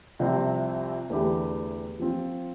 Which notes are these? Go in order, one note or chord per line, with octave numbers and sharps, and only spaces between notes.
C2 C3 F3 C4
E2 D3 A3 E4 G4
F3 C4 F4